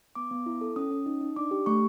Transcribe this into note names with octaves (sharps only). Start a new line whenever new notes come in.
B3 D6
B3
E4
A4
C#4 D#6
C#4
D#4
D#4
D4 D6
G4
A3 C#6